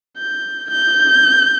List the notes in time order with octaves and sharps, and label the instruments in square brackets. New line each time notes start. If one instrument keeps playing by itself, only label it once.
[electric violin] G6
G6